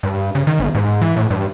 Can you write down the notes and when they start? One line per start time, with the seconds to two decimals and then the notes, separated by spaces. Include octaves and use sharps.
0.03 G2
0.35 C#3
0.47 D#3
0.59 G1
0.75 G#2
1.01 E3
1.16 A2
1.30 G2